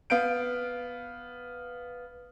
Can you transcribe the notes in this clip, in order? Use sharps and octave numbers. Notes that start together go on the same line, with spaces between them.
B3 F5 G6 D7